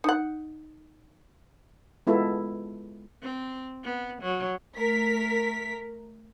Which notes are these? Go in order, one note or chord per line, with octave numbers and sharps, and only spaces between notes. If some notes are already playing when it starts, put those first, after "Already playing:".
D#4 F#5
G#3 B3 E4 F4 A4
C4
B3
F#3
A3 A#4 B6